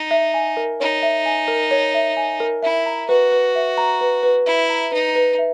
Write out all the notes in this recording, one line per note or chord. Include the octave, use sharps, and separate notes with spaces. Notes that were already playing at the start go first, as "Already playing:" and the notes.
Already playing: D#4
E5
G#5
A#4
D#4 C#5
E5
G#5
A#4
C#5
E5
G#5
A#4
E4 E5
A#5
F#4 B4
B4
E5
A#5
B4
B4
E4 E5
A#5
D#4 B4
B4
E5